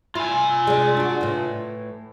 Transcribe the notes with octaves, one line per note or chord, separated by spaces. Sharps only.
E4 F4 G#5
G#3 D4
D4 F#4
A2 E3